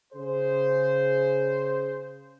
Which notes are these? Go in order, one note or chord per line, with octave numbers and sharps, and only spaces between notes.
C#3 G#4 C5